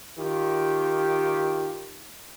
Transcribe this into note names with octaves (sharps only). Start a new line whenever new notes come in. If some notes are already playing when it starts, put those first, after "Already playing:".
D#3 F4 G4